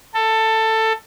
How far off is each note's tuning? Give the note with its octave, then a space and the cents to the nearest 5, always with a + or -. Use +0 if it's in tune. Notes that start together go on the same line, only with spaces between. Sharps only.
A4 +15